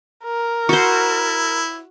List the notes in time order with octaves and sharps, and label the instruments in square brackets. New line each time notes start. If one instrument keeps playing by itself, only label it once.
[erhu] A#4
[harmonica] E4 [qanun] F#4 C5